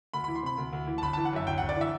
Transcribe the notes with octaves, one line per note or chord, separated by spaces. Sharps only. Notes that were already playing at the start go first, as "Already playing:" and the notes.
D2 B5
E3 B5
C6
C3 B5
D2
D2
E3
A5
G1 B5
E3 A5
F#5
F#2 E5
G1 G5
G1 F#5
D5
E3 E5